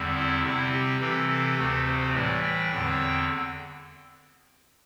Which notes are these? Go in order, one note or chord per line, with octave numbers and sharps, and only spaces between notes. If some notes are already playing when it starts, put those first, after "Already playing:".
Already playing: E2 D3 G3 C4
E4
C3 G3 C4 E4
G4
C3 E3 C4 A4
A4
D2 C3 A3 C4
C5
A2 E3 G3 D5
G5
E2 D3 C4